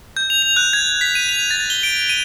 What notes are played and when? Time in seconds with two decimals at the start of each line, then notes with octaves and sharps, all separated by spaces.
0.17 G6
0.30 F7
0.42 F7
0.56 F#6
0.73 G#6
1.01 B6
1.15 D#7
1.29 F7
1.51 A6
1.70 G7
1.83 D7
2.09 D#7